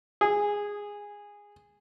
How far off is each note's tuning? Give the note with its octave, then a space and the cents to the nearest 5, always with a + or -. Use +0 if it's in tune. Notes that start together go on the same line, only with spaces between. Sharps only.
G#4 -15